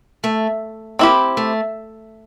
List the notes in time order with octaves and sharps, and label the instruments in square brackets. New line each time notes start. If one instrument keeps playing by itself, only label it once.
[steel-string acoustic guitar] A3
[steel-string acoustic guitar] A#3 [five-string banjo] C4 E4 G4
[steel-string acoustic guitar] A3